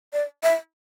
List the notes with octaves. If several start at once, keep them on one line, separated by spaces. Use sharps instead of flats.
D5
E5